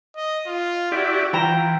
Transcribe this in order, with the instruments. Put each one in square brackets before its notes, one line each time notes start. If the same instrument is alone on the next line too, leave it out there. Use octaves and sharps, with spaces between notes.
[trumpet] D#5
F4
[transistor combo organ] E4 G4 D5 [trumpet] F#4
[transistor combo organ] E3 [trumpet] F4 [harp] G5 A#5 E7